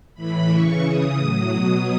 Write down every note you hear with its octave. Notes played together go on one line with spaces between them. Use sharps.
A2 E3 B5
C#3 E3 C#6
C#3 E3 D#6
A2 F#3 D#6
B2 F#3